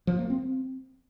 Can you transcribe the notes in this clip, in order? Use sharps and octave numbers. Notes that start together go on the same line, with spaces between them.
F3
A#3
C4